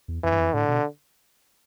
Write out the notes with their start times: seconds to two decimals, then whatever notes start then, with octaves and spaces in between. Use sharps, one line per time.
0.08 E2
0.23 F2 E3
0.32 G2
0.39 F2
0.54 A2 D3
0.68 B2